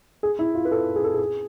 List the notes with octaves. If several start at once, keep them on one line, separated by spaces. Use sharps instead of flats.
G#4
E4
F4
B4
A4
G#4
A4
G#4